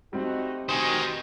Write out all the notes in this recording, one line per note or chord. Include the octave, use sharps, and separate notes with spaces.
G3 A3 C4 D#4 F#4
B2 D#3 F#4 C5 G#5